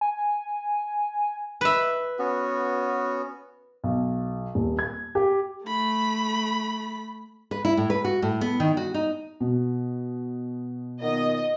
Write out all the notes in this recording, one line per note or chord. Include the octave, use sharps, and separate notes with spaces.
G#5
B4 E5
B3 C#4 F#4
B1
D#1
G#6
G4
A3 B5
B4
E4
A2
B4
F#4
A2
B3
D#3
F#4
D#4
B2
A#2 D#3 B3 D#5